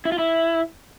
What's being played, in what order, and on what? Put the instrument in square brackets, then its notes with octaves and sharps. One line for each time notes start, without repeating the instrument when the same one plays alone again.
[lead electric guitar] E4
F4
E4